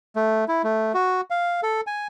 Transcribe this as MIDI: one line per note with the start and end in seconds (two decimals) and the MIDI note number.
0.16 0.45 57
0.48 0.62 64
0.64 0.92 57
0.94 1.21 66
1.30 1.61 77
1.63 1.81 69
1.87 2.07 80